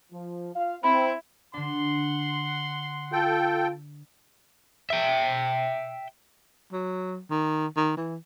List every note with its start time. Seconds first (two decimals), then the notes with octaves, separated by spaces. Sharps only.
0.12 F3
0.54 F4 F5
0.83 C4 E4 B5
1.54 D3 D4 F#5 C6
3.13 F4 A4 G5
4.90 E5 G5
6.72 F#3
7.30 D#3
7.77 D#3
7.97 E3